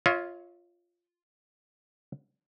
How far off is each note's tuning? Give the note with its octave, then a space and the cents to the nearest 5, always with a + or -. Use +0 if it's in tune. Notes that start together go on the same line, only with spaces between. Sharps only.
F4 +0 C#5 +10 E5 -40